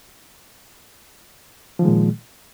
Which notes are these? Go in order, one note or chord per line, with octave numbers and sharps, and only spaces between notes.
A#2 D#3 F3 G#3